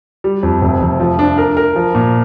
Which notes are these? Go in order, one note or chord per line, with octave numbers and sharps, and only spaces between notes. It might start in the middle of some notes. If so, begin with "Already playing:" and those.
G3
F2
F1
F1
F3
D4
A#4
A#4
F3
A#2